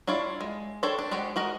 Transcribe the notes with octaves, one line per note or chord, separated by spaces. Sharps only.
D4 E4 F4 C#5 D5
G#3
D4 A4 C5 C#5 G5
D4
G#3 F#4 G4 C5
G#3 F#4 A#4 D#5